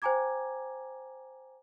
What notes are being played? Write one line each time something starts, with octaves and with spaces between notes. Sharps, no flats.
C5 G5 G#5 A#5 D6 G#6